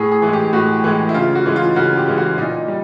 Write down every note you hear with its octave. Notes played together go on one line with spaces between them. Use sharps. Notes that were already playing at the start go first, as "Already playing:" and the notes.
Already playing: A2 G#4
G#4
E3 G#3
G4
A2 F#4
E3 G#3
E4
C#3 F4
F#4
E3 G#3
F4
C#3 F#4
G4
E3 G#3
F#4
A#2 D#4
G3